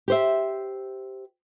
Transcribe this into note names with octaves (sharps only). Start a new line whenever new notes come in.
G4 C5 E5